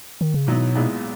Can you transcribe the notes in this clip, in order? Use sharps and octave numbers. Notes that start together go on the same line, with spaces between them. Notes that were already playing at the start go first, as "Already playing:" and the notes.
D#3
C#3
G#2 B2 F#3 B3 E4
B1 A#2 G#3 B3 E4